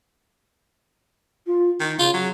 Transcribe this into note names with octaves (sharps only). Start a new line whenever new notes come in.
F4
D#3 D#4
C#3 F4
F#3